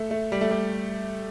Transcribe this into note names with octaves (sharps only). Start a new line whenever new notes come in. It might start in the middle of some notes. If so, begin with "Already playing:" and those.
Already playing: A3
A3
G3
A3
G3